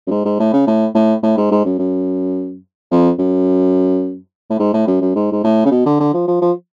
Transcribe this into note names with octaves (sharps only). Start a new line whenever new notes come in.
F#2
G#2
G#2
A2
C#3
A2
A2
A2
G#2
G#2
F#2
F#2
F2
F#2
A2
G#2
A2
F#2
F#2
G#2
G#2
A2
C#3
B2
D3
D3
F3
F3
F3